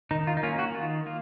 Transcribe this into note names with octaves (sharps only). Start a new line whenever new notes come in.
D#3 D#4
F4
D#4
A#3 C#4 F4
F#4
D#3 F4
A#3 F4